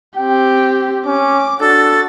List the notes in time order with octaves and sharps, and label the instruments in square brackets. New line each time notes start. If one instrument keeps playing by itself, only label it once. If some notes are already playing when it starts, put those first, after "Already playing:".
[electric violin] C4 G4 [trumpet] G5
[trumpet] C#4 [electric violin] D6
[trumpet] D4 [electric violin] F#4 A6 [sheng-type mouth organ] A4